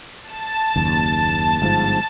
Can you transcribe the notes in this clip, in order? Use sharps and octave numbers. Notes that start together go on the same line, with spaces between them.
A5
F#1 D#2
G1 G#2 F3